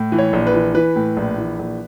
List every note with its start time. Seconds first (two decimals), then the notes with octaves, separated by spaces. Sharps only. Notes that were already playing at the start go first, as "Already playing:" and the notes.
Already playing: A2
0.12 E3
0.19 C#5
0.33 A#1
0.47 B4
0.54 E3
0.74 E3 B4
0.96 A2
1.17 A#1
1.38 E3
1.59 A#1